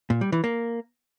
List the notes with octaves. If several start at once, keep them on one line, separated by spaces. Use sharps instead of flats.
A#2
G3
E3
A#3